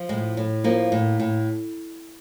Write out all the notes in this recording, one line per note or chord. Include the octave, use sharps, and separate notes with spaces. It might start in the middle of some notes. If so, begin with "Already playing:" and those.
Already playing: F3
A2 G#3
A2
F3 A#3
A2
A2